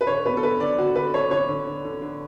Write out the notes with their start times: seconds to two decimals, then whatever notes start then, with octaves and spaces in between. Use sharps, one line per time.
0.01 B4
0.07 D3 C#5
0.26 B3 B4
0.37 A4
0.43 D3 B4
0.60 D3 D5
0.78 D3 F#4
0.95 D3 B4
1.14 D3 C#5
1.31 D3 C#5
1.48 D3
1.67 D3
1.85 D3
2.02 D3